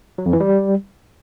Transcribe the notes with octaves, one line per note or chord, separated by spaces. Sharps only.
F#3
F2
E3
G3